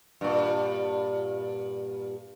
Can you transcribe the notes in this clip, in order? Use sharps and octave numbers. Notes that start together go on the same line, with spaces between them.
G2 A#2